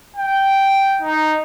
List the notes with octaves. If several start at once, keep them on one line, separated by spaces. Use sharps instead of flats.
G5
D#4